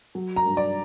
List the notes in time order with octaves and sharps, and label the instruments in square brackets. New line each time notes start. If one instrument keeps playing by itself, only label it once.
[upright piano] F#3
A#5
G2
D5